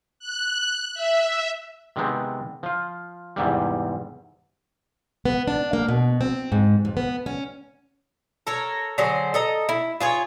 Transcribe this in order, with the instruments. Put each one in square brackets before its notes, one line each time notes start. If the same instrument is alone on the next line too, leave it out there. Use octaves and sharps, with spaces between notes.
[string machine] F#6
E5
[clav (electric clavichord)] C3 D#3 G#3 B3 C4
F3 F4
E2 G#2 C3 G3
[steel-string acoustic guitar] B3
D4
A#3
B2
C4
G#2
F2
B3
C#4
[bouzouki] A4 A#4 C#5
D3 F#3 G#4 C5
A4 D#5 A#5
E4
F4 G#4 C#5